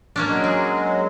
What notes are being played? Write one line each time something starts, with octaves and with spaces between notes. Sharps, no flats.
A#3 C#4 D4
F#3 G#3
G#4